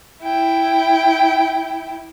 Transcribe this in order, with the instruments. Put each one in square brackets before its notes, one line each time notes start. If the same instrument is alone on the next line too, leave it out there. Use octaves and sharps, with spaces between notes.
[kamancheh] E4 G5